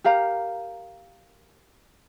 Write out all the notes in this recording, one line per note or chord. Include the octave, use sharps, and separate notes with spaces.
G4 A#4 F5 A#5